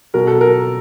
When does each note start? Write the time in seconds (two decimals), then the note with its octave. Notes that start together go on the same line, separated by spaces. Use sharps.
0.14 B2 F#3 A#4
0.27 A4
0.41 A#4